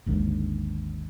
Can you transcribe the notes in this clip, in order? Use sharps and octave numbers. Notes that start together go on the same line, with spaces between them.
G#1 D#2 G#2 D3